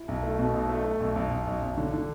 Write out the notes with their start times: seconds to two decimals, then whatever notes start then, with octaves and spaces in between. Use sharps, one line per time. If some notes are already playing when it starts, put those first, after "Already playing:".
Already playing: E4
0.08 B1
0.23 A3
0.39 B2
0.54 B1
0.69 A3
0.84 A3
1.00 B1
1.16 B1
1.31 B1
1.47 B1
1.62 B1
1.77 D3
1.93 D3